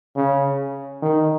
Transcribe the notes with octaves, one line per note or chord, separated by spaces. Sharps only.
C#3
D#3